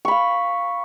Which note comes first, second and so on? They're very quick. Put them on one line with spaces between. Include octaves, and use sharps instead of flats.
C#6 B5 F5